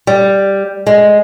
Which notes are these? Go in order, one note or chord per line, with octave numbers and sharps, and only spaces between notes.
G3
G#3